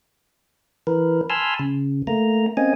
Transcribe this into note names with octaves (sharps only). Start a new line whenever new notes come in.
E3 A#4 B4
G#5 A5 B5 C6 E6 F6
C#3
A3 A#3 A#5
A#3 C4 C#4 D#5 G#5